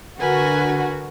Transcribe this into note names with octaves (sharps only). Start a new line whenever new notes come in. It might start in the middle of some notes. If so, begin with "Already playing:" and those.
D3 F#4 A#4 B4 G#5